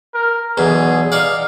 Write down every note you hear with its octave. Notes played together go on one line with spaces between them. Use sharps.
A#4
B1 E2 B2 G#4
D#4 D5 F5